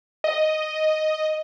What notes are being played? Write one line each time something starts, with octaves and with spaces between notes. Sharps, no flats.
D#5